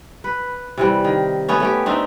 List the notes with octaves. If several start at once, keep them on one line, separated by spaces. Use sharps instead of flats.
B4
C3 E3 G3
D#3
A3 B3 C#4
A3 C#4 G4
A3 C4 D4 D#4